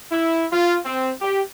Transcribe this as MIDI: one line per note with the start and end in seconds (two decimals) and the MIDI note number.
0.11 0.45 64
0.52 0.77 65
0.85 1.11 60
1.21 1.40 67